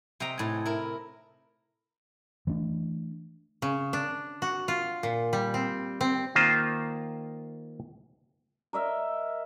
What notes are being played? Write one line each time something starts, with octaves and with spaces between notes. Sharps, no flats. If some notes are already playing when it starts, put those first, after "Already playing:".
C3 D#5 G5 A#5
A2 G#5
E4 A#4
E3 A3 C4 D4
C#3
D4
F#4
F4
A#2
G3
C4
C4
D#3 A#3 F4 C5
A#4 D#5 E5